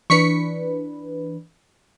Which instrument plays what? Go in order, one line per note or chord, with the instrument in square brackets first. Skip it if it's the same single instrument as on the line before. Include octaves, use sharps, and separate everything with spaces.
[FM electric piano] E3 D4 B4 [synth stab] C#6 B6 C#7